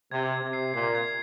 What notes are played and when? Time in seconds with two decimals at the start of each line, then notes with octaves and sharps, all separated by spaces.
0.11 C3 G#6
0.33 G#6
0.43 C3
0.53 C7
0.74 A#2 C7
0.95 G#6